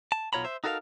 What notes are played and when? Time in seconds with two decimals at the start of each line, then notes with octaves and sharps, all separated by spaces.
0.12 A5
0.33 B1 B2 F4 C#5 A#5 B5
0.45 C5 E5
0.64 D#4 F#4 A4 A#4 E5 F5